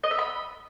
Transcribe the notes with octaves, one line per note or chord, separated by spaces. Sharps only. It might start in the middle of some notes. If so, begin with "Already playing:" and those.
D#5
E5
B5